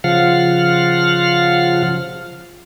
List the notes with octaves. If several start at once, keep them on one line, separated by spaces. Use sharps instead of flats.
C#3 F3 F4 F5 F#5 F6